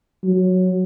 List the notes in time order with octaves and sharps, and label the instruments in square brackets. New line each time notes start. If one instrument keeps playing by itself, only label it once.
[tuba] F#3